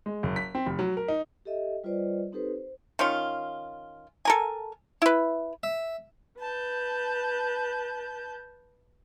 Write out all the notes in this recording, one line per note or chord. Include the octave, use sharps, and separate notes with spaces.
G#3
F#1
B6
C4
F1
F#3
A#4
D#4
G4 A4 D#5 E5
G3 F4 B4 C5 D5 D#5
C4 D#4 G4 A4 B4 C5
C5
D#3 C#4 F4
A4 A#4 G#5
E4 B4
E5
B4 A5 G6